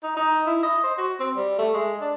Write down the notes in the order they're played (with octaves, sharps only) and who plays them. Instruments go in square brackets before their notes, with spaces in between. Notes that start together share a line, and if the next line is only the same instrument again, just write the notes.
[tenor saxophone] D#4
D#4
E4
D#5
C5
F#4
C4
G3
A3
G#3
D4